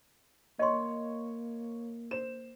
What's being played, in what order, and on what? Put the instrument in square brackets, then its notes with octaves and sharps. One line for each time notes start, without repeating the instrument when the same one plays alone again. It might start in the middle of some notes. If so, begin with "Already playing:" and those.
[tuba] A#3 [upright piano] C#5 C#6 [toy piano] D#5 C6
[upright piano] C5 E7